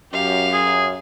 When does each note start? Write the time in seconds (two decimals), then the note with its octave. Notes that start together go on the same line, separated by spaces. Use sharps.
0.13 F#2 G4 F5
0.53 G#4